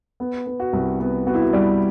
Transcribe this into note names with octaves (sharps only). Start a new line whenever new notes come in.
B3
B3
F#4
C2
B3
B3 F#4
E4
F#4
G3 B4 D5